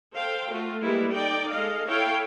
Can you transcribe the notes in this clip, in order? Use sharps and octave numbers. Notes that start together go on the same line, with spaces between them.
A4 C5 F5 G5
A3 F4 F#4
G3 G#3 A#3 E4 B4
D#4 A4 D5 G5
G#3 A4 D#5 F5
E4 A4 C#5 F5 G5